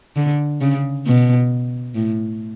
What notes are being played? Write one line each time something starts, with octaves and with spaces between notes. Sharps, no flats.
D3
C#3
B2
A2